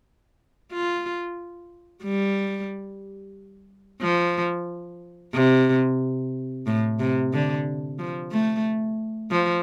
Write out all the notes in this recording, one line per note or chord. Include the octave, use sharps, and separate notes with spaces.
F4
G3
F3
C3
A2
C3
D3
F3
A3
F3